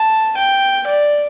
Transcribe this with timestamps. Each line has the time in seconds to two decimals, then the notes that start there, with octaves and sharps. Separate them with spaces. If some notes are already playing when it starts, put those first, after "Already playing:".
Already playing: A5
0.37 G5
0.87 D5